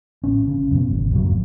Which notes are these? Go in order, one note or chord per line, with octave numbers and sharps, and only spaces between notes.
A1 C#4
C#3
F#2 B2
G#1
F2 C3 F3 F#3